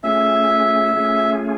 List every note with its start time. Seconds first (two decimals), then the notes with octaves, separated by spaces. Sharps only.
0.03 A3 C#4 F4 G#4 E5
0.93 A3 C#4 F4 G#4